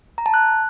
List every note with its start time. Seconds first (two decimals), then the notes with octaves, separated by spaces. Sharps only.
0.18 A#5
0.26 A5
0.34 F#6